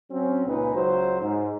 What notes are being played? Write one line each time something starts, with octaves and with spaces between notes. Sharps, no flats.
F#3 C4 C#4
C#2 A#2 D#4 G#4 B4
C#2 F#3 C5
G#2